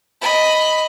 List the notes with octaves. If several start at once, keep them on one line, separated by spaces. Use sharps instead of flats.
D#5 B5